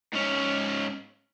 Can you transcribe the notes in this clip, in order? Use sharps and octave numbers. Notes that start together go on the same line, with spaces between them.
G#2 C#4